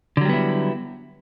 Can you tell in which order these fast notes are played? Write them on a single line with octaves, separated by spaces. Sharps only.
D3 F#3 G3 B3 E4